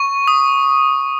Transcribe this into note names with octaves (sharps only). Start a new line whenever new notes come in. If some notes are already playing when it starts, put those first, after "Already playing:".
Already playing: C#6
D#6